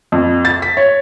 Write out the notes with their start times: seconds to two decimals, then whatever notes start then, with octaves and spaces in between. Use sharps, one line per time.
0.12 F2
0.45 A6
0.62 B6
0.77 C#5